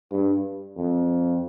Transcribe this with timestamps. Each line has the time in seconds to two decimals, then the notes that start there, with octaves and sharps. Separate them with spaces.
0.12 G2
0.77 F2